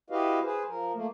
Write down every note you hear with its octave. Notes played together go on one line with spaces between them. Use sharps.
E4 F#4 G4 B4 D#5 F5
G#4 B4 C5
F3 A#4
A3 A#3